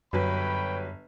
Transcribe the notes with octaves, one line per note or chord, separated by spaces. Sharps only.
G1 F#2 F#3 B4 C#5 G5 B5